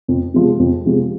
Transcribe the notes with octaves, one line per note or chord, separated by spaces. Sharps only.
F2
C3 F3 G#3
F2
C3 F3 G#3